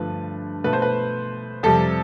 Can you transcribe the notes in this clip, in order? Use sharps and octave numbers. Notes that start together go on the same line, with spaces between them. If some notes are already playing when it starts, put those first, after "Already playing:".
Already playing: G2 D3 F3 A3 B4
B2 A3 B4
C5
B4
F2 C3 G3 A4